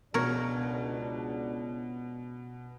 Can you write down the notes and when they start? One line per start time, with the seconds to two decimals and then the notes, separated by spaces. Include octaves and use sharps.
0.14 C#2 B2 D4 A#4 C#5